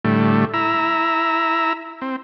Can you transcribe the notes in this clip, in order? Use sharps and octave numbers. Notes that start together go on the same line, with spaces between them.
A2 D3 G3 A3
E4 A#5 E6
C4